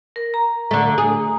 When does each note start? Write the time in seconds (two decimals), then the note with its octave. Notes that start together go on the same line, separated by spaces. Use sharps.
0.16 A#4
0.34 A#5
0.71 D3 A3
0.98 G#4